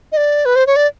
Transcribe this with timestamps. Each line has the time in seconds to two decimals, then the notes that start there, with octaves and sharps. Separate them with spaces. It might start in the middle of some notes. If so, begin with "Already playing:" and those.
0.12 D#5
0.17 D5
0.45 B4
0.56 C5
0.67 C#5
0.76 D5